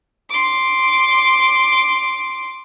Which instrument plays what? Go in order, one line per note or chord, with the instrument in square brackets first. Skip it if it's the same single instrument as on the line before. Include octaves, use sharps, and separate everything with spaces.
[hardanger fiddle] C6 D6